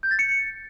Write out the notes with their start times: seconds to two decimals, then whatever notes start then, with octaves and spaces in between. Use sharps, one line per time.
0.03 G6
0.11 A6
0.19 C#7